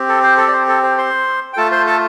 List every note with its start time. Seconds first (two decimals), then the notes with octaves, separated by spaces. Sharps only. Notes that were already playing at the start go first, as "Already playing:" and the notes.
Already playing: C4 G4
0.09 A4
0.24 C5
0.37 A4
0.48 D5
0.53 C5
0.68 A4
0.83 C5
0.98 C5 C6
1.53 G5
1.57 A3 F4 A4 A5
1.71 C5 C6
1.86 A4 A5